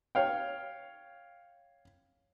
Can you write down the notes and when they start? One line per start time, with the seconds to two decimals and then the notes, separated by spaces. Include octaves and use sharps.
0.15 C#5 F5 G5